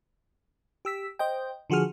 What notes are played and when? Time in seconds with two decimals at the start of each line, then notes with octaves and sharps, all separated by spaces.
0.85 G4 E6 B6
1.19 C5 D#5 G5
1.70 D3 F3 F#4 G#4 F6